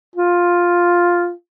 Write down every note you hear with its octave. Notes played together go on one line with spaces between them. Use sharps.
F4